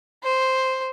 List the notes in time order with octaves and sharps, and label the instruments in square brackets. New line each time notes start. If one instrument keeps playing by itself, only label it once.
[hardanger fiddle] C5